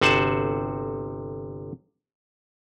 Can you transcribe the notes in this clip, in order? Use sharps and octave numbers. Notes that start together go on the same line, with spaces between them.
G1 C3 F#4 C5 F#5 A5